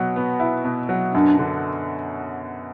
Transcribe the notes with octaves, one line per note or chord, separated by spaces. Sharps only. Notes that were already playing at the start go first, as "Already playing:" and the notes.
Already playing: B2 F#3
B3
E4
B2
F#3
F#2 D4
D3